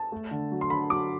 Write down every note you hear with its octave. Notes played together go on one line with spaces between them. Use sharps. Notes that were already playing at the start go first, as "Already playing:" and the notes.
Already playing: A5
A3
D3
F#3
C6
D3 B5
F#3 D6